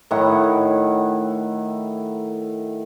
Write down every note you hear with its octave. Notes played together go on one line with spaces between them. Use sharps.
A2 D#3 E4 F#5